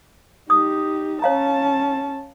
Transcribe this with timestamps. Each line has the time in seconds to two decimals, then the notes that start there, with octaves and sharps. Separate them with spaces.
0.50 D#4 G4 D#6
1.22 C#4 C#5 F5 A5 A#5